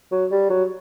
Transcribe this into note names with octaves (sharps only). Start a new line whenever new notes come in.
F#3
G3
F#3